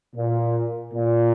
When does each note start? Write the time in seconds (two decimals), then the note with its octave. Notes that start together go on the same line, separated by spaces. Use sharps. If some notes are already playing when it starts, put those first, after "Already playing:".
0.15 A#2
0.93 A#2